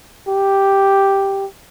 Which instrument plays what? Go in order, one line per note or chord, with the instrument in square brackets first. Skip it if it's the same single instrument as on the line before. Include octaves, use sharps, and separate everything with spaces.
[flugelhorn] G4